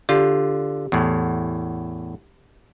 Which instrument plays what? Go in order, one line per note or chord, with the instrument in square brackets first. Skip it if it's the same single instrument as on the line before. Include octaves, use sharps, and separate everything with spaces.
[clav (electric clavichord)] D3 F4 [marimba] G4
[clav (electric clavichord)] E2 A2